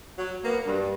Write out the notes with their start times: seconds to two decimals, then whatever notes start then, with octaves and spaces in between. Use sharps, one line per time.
0.18 F#3
0.44 A#3 B3
0.66 G2